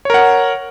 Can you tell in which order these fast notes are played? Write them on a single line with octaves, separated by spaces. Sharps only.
C#5 A#4 F#5